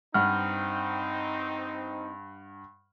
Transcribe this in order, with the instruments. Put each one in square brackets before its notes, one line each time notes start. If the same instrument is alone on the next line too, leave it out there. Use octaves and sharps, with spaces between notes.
[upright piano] G2 F#5 [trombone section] C4 D#4 [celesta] F6